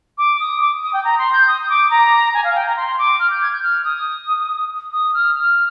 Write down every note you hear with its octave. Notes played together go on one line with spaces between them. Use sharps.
D6
D#6
D6
D#6
G5
A#5
C6
G6
D#6
D6
A#5
G#5
F5
G5
A#5
C6
D6
F6
G6
G#6
G6
F6
D#6
D#6
F6
F6